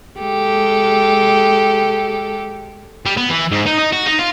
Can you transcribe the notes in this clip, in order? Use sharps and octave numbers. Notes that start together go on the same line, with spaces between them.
G#3 G4 A4
G3
B3
E3
G#2
D#4
D#4
F#4
D#4
F4